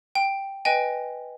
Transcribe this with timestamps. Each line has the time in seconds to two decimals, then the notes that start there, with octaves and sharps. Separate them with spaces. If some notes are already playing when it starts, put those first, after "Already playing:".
0.15 G5
0.65 B4 D#5 G5 G#5